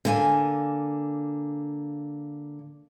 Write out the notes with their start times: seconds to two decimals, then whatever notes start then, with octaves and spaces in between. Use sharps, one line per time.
0.05 D3 A#3 G#5